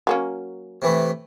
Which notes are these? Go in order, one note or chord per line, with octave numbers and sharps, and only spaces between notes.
F#3 A#3 C#4
C3 E3 A3